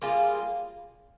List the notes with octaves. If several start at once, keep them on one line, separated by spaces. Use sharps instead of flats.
G3 A#3 F4 G#4